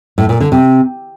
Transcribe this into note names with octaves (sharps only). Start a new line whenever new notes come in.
A2
A#2
D3
C3